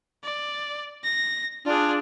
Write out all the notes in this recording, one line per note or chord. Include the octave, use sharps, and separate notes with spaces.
D5
A#6
D4 F4 G#4